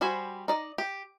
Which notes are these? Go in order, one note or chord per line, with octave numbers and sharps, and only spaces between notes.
G3 F#4 C5 G#5 B5
D#4 D5 D#5
G4